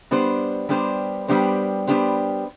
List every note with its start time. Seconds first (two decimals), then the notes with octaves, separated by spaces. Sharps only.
0.11 G3 B3 D4 G4 C5
0.69 G3 B3 D4 G4 C5
1.28 G3 B3 D4 G4 C5
1.87 G3 B3 D4 G4 C5